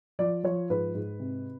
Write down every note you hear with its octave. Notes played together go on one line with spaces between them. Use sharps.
F3 D5
F3 C#5
G#2 B4
G#2
C3